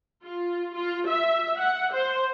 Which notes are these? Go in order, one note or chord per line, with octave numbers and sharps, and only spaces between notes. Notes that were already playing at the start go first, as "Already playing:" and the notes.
F4
F4
E5
F#5
C5